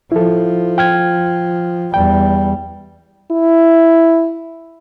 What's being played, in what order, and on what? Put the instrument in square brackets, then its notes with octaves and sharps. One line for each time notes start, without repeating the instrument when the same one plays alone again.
[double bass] F3 [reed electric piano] E4 A4
[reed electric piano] G5 F6 G#6
[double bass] E2 G3 [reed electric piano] G5
[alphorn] E4